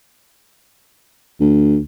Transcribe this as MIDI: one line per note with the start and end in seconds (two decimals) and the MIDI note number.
1.41 1.79 38